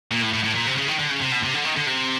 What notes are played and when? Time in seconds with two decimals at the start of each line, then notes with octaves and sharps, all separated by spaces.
0.11 A#2
0.22 A2
0.33 A2
0.44 A2
0.55 A#2
0.66 C3
0.77 C#3
0.88 D#3
0.99 D3
1.10 C#3
1.21 C3
1.32 B2
1.43 C3
1.54 D3
1.65 D#3
1.76 D3
1.87 C3